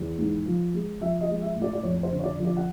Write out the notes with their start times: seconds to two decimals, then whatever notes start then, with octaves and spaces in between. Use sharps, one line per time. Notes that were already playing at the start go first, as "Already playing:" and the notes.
Already playing: E2
0.18 G#2
0.46 F3
0.74 G#3
1.00 F3 E5
1.21 D#5
1.28 G#3
1.42 E5
1.55 A2
1.62 D5
1.73 D5
1.83 F2 C#5
2.03 C5
2.11 D3
2.19 C#5
2.24 D5
2.38 F3
2.45 D5
2.56 F#5